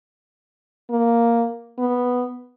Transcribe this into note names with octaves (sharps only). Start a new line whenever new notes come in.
A#3
B3